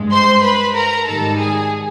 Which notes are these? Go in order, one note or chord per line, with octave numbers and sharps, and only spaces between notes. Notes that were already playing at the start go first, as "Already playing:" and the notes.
Already playing: G2 G#3
C5 C6
B4 B5
A#4 A#5
G#2 D#3 G3 A4 A5
G#4 G#5